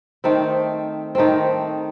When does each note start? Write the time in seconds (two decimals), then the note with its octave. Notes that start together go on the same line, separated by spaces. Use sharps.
0.24 D#3 A3 C4
1.15 D#3 A3 C4